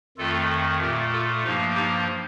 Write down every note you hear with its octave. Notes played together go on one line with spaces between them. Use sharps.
F2 D#3 A3 F4 A4
A#2 A3 G4 A#4
F4 A4
G2 F3 A#3 D#4 G4
D#4 G4